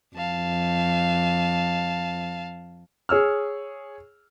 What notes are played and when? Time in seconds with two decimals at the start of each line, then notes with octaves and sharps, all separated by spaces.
0.16 F2 F5 A5
3.09 G#4 C#5 E6 F6